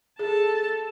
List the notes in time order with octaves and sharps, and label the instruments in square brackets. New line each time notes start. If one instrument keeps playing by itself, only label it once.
[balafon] G#4 [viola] A4 A5